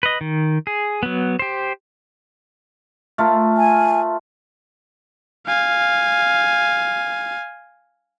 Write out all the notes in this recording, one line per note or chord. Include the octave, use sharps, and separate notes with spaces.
B4 D#5
D#3
G#4
F#3 B3
G4 C5
A3 F4 A#4
G#5
F5 G#5